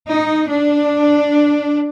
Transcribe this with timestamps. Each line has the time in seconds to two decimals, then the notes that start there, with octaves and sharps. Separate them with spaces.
0.09 D#4
0.49 D4